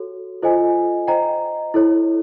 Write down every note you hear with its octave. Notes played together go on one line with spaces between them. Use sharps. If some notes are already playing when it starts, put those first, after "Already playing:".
Already playing: F#4 A4 C#5
F4 A4 C5 D#5 G#5
C5 D#5 G5 A#5
E4 A4 C#5